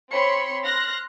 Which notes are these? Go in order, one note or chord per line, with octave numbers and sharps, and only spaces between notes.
C4 C#5 B5 C6 C#7
C6 F6 F#6 A#6